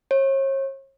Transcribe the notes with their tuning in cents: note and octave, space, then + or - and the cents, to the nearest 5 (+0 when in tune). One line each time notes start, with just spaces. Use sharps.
C#5 -40